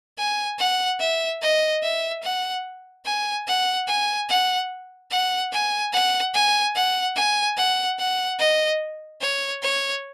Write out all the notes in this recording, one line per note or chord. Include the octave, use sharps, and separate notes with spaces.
G#5
F#5
E5
D#5
E5
F#5
G#5
F#5
G#5
F#5
F#5
G#5
F#5
G#5
F#5
G#5
F#5
F#5
D#5
C#5
C#5